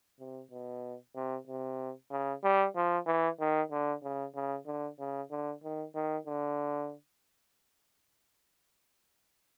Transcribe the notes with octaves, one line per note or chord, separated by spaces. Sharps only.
C3
B2
C3
C3
C#3
G3
F3
E3
D#3
D3
C#3
C#3
D3
C#3
D3
D#3
D#3
D3